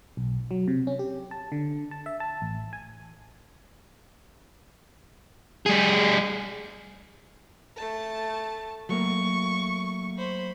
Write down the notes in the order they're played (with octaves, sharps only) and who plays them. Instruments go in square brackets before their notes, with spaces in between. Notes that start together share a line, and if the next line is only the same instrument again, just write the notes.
[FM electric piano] B1
F#3
C3
C#4
G4
A5
D3
A5
E5
A5
A1
G#5
[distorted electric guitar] G3 G#4
[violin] A3 A5
[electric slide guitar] F#3 A3 A#3 [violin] C#6
[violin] C5 B5